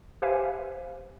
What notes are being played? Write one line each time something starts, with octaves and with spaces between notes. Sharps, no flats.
G4 B4 C5 E5 F5 G#5